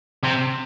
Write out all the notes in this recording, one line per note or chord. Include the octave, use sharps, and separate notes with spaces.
C3